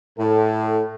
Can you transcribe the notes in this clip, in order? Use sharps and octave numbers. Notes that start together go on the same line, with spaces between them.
A2 A4